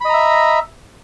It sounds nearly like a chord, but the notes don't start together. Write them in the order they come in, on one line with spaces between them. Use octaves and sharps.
B5 D#5 A#5 E5